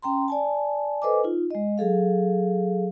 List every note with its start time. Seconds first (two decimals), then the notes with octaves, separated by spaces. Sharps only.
0.02 C#4 G5 A#5 C6
0.28 D5 G#5 A5
1.02 A4 B4 C5 D#5 G#5 D6
1.24 D#4 F4
1.51 G#3 D#5
1.78 F#3 G#4 A4 F5